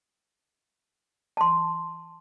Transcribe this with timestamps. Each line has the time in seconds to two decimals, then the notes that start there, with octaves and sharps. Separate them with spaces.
1.37 A5 C6